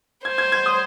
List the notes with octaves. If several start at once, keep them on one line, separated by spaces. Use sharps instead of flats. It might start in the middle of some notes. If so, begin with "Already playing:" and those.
C5 G#6
G#6
G#6
D#6